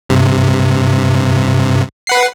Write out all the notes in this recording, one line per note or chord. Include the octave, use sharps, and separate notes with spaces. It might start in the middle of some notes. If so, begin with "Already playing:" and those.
G2 C3
B4 F#5 C7